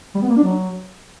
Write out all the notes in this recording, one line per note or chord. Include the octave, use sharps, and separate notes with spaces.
G3
B3
A#3
D4
F#3